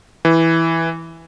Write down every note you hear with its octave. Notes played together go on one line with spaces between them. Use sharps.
E3